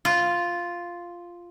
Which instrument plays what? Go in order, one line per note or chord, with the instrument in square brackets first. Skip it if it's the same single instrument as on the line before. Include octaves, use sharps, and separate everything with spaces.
[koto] F4